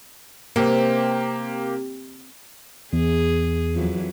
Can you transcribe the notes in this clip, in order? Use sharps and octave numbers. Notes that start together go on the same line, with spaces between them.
C3 A#3 G4
E2 G#4
F2 E3 F#3